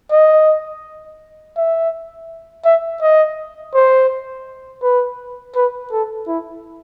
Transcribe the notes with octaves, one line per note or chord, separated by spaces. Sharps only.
D#5
E5
E5
D#5
C5
B4
B4
A4
E4